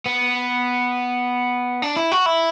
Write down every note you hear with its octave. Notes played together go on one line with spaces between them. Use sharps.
B3
D4
E4
F#4
E4